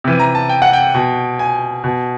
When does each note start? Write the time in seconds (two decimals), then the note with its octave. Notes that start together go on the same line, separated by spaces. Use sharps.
0.04 C3 E3
0.19 A#5
0.35 A5
0.49 G5
0.62 F#5
0.73 G5
0.94 B2
1.39 G#5
1.84 B2